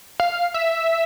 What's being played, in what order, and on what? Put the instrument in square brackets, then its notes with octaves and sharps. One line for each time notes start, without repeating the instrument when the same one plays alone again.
[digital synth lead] F5
E5